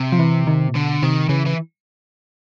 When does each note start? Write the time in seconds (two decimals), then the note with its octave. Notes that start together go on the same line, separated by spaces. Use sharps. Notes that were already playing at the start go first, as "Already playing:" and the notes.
Already playing: C3
0.12 F3
0.19 E3
0.47 D#3
0.69 A#2
0.74 B2 D3
1.02 C3 D#3
1.29 C#3 E3
1.46 E3